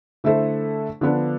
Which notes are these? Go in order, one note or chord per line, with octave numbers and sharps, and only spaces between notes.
D3 A3 E4 A4 C5
D3 F3 B3 D4